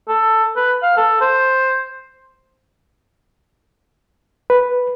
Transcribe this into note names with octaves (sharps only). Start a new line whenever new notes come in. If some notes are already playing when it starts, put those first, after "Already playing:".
A4
B4
F5
A4
C5
B4